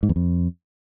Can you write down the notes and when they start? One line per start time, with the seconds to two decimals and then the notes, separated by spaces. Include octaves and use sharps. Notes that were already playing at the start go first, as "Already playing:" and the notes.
0.03 G#2
0.09 E2
0.16 F2